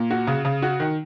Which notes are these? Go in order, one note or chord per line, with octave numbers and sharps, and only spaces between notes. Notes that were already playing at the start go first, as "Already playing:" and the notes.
Already playing: A#2
F#4
C#3
C#3
F#4
D#3